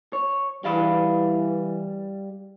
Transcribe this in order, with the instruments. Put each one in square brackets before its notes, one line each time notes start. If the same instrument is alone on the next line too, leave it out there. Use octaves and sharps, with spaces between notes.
[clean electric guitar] C#5
[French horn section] E3 [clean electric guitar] G3 F5 B5